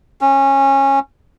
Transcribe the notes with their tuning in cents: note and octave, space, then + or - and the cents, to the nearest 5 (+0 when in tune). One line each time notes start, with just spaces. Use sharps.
C#4 -20